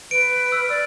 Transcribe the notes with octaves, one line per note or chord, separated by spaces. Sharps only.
B4 D7
E6 F6
D5 E6